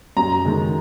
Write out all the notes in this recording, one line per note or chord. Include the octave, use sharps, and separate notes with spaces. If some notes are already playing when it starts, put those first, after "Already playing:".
F#2 A#5
D#3 G#3